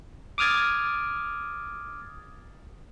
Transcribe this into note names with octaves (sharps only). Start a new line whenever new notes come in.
D6 D#6 F6 G#6 A6